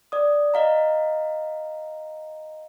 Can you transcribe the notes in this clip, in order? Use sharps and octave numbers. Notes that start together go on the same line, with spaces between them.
D5 D#6
D#5 F5 A#5